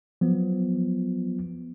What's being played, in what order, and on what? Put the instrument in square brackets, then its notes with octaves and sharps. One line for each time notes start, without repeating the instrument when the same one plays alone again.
[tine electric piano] F3 F#3 B3